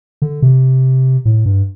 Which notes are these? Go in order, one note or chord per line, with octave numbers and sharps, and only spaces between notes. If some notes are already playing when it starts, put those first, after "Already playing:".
D3
C3
A2
G2